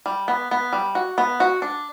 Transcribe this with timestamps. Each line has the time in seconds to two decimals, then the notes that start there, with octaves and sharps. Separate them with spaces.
0.06 G3
0.28 B3
0.51 B3
0.73 G3
0.95 F#4
1.18 B3
1.40 F#4
1.62 D4